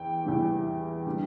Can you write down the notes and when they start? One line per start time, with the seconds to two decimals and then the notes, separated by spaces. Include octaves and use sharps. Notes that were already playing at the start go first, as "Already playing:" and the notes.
Already playing: E2 E3 G5
0.25 E2 E3 G3
1.06 D3 G3